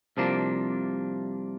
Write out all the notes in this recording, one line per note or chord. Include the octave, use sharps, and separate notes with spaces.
C2 C3 F3 A#3 D4